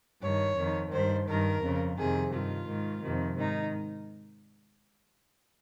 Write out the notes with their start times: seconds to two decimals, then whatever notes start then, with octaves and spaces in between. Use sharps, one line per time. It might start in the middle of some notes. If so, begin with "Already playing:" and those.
0.22 G2 D#3 C#5
0.58 F2 D#3
0.92 G2 D#3 C5
1.28 G2 D#3 A#4
1.62 F2 C#3
1.97 F2 C3 D#3 G#4
2.32 G2 D#3 F4
2.68 G#2 D#3
3.03 F2 C3 D#3
3.38 G#2 D#3 D#4